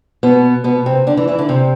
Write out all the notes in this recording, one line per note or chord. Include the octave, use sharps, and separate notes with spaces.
B2 B3
B2 B3
C3 C4
D3 D4
E3 E4
E3 E4
D3 D4
C3 C4